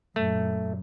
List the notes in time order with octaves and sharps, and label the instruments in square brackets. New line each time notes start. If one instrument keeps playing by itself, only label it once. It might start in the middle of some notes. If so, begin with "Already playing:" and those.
[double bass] F#2 A#2 [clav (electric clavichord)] A3